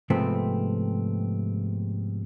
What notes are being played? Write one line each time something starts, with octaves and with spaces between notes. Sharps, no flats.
G#2 C3 F3 A3 B3 C4